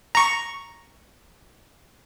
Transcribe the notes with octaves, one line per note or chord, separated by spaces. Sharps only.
A#5 C#6